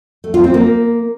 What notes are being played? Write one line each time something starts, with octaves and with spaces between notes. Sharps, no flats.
A3
F4
C4
A#3